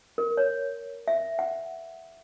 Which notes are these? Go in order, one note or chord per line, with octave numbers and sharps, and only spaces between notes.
A#4
C#5
E5
F#5